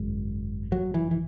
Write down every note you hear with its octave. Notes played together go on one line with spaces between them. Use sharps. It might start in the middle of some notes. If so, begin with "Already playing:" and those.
Already playing: G#1 F#2 C#3 G#3
F#3
E3
E3